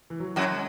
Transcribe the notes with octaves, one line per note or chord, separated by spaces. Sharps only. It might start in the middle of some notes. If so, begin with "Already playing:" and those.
E3
F#3
F#2 F#3
G#3